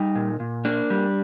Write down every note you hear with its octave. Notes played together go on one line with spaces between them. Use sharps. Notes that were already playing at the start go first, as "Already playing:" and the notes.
Already playing: G3 D#4
A#2
A#2
A#3 D4
G3